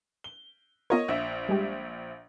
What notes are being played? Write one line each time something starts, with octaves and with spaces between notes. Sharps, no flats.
G7
B3 F4 A#4 C#5 D#5
A#1 E5
G3 G#3 G4